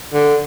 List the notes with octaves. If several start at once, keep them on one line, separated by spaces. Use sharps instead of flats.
D3